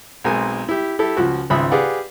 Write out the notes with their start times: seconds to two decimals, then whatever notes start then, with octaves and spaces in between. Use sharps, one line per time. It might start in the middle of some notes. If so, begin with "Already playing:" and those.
0.24 B1 G#3 C4 A#4 G#5
0.69 E4 G4
0.99 E4 G4 A4
1.17 C#2 F3 F#4
1.50 G#1 C#2 E5 B5 D#6
1.72 G4 G#4 B4 D5 F5 F#5